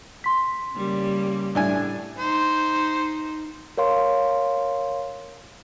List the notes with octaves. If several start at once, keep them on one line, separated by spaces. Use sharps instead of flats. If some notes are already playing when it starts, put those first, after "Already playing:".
C6 B6
C#3 G3 A#3
A2 D4 G#5
D#4 C5
A#4 C#5 F5 C6